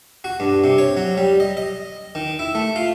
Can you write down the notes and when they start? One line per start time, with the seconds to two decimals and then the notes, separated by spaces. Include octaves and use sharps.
0.24 F#4
0.40 G2
0.64 C3
0.78 C#5
0.97 F#3
1.17 G3
1.40 D#5
1.57 D#5
2.15 D#3
2.39 E4
2.55 A3
2.76 F4